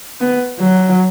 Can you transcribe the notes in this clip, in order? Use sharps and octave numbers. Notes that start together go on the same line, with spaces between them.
B3
F#3